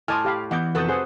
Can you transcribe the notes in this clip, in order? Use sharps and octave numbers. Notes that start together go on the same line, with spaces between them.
A2 D#5 G#5 A5 C6 D6 F6
G4 F5 B5
E3 B3 D#5 F#5 D6 G6
F1 F#4 A4 B4 F#5 A5 D#6 G6
G#4 C5 F#5